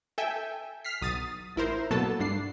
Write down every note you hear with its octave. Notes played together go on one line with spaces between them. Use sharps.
A4 E5 G5 G#5
F6 B6 C7
B1 D#6 A6
A1 E4 A#4 C5
B2 F#3 A#3 B3 A4 A5
G2 D4 C7